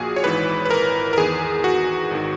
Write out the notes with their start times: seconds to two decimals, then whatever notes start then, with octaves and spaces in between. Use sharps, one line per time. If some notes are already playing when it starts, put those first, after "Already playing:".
Already playing: A#1 A#2 F#4 G#4
0.16 C#5
0.24 G#1 G#2 E3 B4
0.65 B4
0.71 A#4
1.13 A#4
1.17 E2 D#3 G#4
1.64 F#4
2.11 G#1 D#3